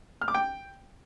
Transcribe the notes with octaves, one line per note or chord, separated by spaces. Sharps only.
F6
D6
G5